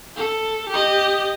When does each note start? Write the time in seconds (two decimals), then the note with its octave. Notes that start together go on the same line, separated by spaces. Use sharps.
0.16 A4
0.70 G4 D#5